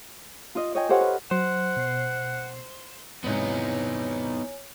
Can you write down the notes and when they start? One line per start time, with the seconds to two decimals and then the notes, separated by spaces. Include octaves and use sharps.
0.55 F4 D#5
0.75 C#5 D#5 G5 G#5
0.89 G4 A4 C5 C#5 F5 F#5
1.01 B4
1.31 F#3 C5 F#5
1.77 B2 C7
3.24 E2 G#2 C3 B3 D#4 C#5 G#5